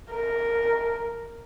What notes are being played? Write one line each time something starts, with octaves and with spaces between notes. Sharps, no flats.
A#4